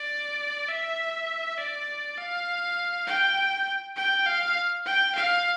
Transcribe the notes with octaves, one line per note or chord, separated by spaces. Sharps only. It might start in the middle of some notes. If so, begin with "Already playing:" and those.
Already playing: D5
E5
D5
F5
G5
G5
F5
G5
F5